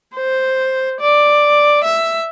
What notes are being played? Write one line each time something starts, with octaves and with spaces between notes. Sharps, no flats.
C5
D5
E5